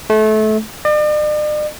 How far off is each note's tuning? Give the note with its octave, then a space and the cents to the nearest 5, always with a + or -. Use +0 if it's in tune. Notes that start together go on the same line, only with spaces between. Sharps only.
A3 -25
D5 +45